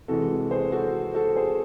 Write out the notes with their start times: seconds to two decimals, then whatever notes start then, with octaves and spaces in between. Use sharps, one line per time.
0.08 C3 E3 G#3 F#4 A4
0.51 G#4 C5
0.72 F#4 A4
1.15 F#4 A4
1.36 G#4 C5